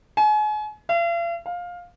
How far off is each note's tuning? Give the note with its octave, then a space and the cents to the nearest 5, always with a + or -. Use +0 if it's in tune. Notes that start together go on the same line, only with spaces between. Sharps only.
G#5 +35
F5 -45
F5 +15